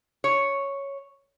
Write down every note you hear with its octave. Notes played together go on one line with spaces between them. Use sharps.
C#5